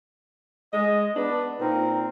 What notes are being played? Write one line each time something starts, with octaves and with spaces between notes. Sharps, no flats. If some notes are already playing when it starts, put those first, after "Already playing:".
G#3 D#5
B3 D4
A#2 C4 D#4 A#4